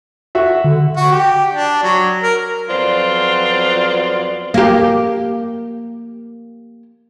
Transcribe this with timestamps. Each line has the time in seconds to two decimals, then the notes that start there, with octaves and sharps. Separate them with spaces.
0.35 F#4 E5
0.64 D3
0.96 F#4
1.12 G4
1.53 D4
1.83 F#3
2.23 A#4
2.70 F2 F#3 B3 F4 C5 D5
4.54 A#3 G4